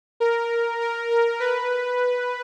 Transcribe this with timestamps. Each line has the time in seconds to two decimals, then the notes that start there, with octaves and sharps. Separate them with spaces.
0.20 A#4
0.81 A#4
1.11 A#4
1.40 B4